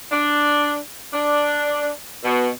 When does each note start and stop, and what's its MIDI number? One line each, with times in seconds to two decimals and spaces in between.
0.11 0.76 62
1.13 1.89 62
2.24 2.49 47